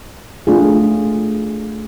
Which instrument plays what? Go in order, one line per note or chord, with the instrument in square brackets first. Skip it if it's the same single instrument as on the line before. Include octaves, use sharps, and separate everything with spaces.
[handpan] A3 D4 F4 G#4